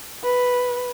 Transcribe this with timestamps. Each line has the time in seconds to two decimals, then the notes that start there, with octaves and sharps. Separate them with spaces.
0.23 B4